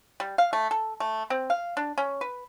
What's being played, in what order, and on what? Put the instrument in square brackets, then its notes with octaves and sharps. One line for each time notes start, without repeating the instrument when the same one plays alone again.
[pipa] G3
F5
A3
A4
A3
C4
F5
D4
C#4
B4